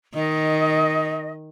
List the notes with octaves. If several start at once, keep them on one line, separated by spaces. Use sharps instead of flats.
D#3 D#5